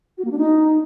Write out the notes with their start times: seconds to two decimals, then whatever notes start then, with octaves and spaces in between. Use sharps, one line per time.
0.18 F#4
0.24 A#3
0.31 D4
0.38 D#4